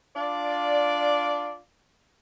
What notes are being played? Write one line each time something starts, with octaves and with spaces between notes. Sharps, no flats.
D4 F4 D5